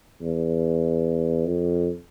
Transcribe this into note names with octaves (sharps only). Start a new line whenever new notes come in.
E2
F2